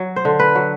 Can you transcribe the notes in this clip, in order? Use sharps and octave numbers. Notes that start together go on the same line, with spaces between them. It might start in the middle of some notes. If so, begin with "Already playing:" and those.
Already playing: F#3
C5
D3
B4
F#3